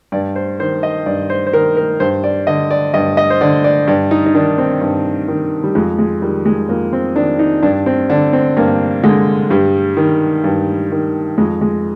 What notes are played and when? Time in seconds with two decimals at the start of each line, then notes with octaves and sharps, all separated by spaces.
0.12 G2 D5
0.36 C5
0.59 D#3 C5
0.83 D#5
1.06 G2 D5
1.30 C5
1.47 C5
1.53 D#3 A#4
1.77 A#4
2.00 G2 C5
2.24 D5
2.47 D3 D#5
2.71 D5
2.94 G2 D#5
3.17 D#5
3.30 C5
3.41 D3 D5
3.64 D5
3.87 G2 D5
4.11 D#4
4.26 D#4
4.35 D#3 D4
4.58 C4
4.81 G2
5.28 D#3
5.64 G3
5.75 F2 G#3
5.99 G#3
6.22 D#3 G3
6.46 G#3
6.69 F2 A#3
6.93 C4
7.16 D#3 D4
7.39 D#4
7.63 G2 D4
7.86 C4
8.10 D3 D4
8.33 C4
8.57 G2 A#3
9.03 D3 G#3
9.50 G2 G3
9.97 D#3
10.44 G2
10.92 D#3
11.38 F2 G#3
11.61 G#3